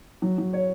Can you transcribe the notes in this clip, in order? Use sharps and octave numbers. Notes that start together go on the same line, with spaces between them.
F#3
F#3
C#5